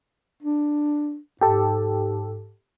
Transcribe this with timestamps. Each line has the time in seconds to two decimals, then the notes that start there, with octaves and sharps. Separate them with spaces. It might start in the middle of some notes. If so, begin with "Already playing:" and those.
0.43 D4
1.41 G#2 G4 A4